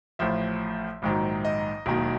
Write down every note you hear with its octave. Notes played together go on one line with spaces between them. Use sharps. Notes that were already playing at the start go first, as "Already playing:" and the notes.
A1 A2 F3 E5
A#1 G#2 D#3 F#3
D#5
E1 D#2 D#3 F#3